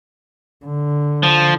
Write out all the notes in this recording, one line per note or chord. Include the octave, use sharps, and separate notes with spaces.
D3
F3